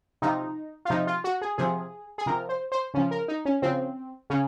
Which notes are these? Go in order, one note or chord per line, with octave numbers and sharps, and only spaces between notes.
C3 F3 D#4
F4
C3 F3 D#4
F4
F#4
G#4
C3 F3 G#4
G#4
C3 F3 A#4
C5
C5
C#3 F3 C#4
A#4
D#4
C#4
C#3 F3 C4
C#3 C#4